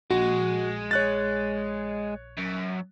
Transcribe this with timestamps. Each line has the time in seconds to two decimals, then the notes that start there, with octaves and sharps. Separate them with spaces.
0.10 A#1 G#3 F#4
0.91 C#5 F#6 A6
2.38 F#2